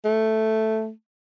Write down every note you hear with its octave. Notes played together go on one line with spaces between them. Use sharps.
A3